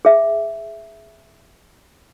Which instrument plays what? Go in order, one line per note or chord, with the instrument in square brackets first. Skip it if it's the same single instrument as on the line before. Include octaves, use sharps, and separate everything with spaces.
[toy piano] G#4 E5